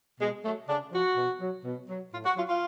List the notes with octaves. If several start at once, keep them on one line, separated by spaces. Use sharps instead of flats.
B2 G#3
F#3 A3
C#3 D4
F3 F#4
B2
F#3
B2
F#3
A2 F4
F#4
F#3 F4
F4